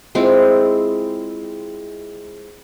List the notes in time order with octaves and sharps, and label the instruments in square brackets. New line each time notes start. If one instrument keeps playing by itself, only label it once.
[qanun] G#3 C4 E4 F4